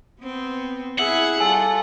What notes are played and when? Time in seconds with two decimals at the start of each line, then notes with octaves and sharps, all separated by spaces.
0.21 B3 C4
0.99 E4 G#4 E5 F#5
1.40 G3 F4 A4 G#5